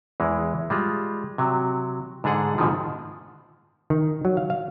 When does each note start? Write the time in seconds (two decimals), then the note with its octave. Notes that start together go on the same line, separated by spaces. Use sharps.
0.20 E2 E3 G#3
0.70 G3 G#3 F4
1.38 C3 F#3
2.24 G#2 D3 D4 G#4 F#5
2.58 G#2 B2 D3 D#3 F3
3.90 D#3
4.25 F#3
4.37 F5
4.50 F5